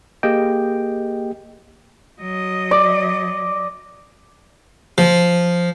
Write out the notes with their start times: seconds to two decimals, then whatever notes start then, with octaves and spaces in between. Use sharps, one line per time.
0.23 A#3 G4 G#4 D#5 G5
2.20 F#3 D#5
2.71 D5
4.98 F3